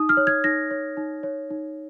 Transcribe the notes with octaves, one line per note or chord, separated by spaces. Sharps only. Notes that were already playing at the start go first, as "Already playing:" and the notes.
Already playing: D#4 D#6
F6
C#5
G#6
D#4 A#6
C#5
D#4
C#5
D#4